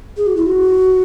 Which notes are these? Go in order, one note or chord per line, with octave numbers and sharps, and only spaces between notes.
G#4
F#4
E4
F#4